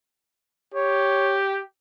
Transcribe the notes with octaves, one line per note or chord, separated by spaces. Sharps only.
G4 C#5